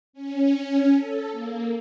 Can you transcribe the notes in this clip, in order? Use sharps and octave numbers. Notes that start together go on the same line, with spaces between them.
C#4
A4
A#3